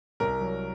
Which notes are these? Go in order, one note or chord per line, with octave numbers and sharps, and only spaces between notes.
C2 A#4
F#3